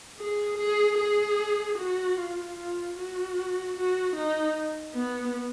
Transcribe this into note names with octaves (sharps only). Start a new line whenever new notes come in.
G#4
G#4
G#4
F#4
F4
F4
F#4
F#4
D#4
B3